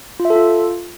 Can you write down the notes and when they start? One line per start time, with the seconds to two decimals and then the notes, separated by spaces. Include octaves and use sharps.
0.20 F4
0.25 E5
0.30 A4
0.35 F4